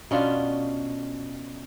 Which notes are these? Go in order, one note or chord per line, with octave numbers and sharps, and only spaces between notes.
B2 C#4 D4 F4